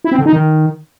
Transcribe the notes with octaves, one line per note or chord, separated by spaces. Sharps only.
E4
C4
D3
D#4
D#3